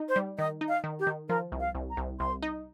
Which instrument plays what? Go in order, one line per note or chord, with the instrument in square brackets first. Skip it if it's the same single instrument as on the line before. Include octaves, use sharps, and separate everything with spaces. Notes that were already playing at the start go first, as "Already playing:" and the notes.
Already playing: [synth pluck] D#4
[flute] C5
[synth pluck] G3
[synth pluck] D#3 [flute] D#5
[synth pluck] D#4
[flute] F5
[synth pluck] D#3
[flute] G4
[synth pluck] D#3
[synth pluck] F3 [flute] A#4
[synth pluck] C2
[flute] F5
[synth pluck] C2
[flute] A#5
[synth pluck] C2
[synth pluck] C2 [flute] C6
[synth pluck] D#4